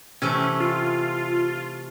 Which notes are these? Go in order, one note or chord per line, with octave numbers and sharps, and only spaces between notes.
C3 E3 A3 C#4
F4